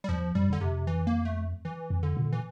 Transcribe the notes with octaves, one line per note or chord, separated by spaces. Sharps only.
G3
E2 F3
F2 G3
G2
F2 D3
F2 C3
E3
A#3
A3
E3
F2
D3
A#2
E3